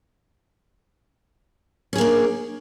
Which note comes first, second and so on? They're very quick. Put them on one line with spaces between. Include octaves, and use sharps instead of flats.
C#4 G#4 A#3 D4